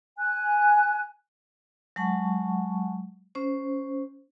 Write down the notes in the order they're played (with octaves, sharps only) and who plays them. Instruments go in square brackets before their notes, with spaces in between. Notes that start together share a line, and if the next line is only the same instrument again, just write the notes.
[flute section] G#5 F#6
[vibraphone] F#3 G#3 F#5 A5 C#6
C#4 C5